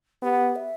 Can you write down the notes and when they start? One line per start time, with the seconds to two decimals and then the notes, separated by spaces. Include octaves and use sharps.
0.22 B3 G4
0.56 E5